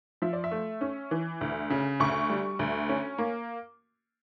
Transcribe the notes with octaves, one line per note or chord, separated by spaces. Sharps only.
F3 E5
D5
E5
A3
C#4
E3
D2
C#3
D2 C#6
G3
D2
C#4
A#3